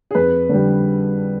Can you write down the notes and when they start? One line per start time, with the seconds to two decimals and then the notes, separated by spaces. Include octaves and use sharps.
0.11 G#4
0.15 F2 B4
0.49 D3 G3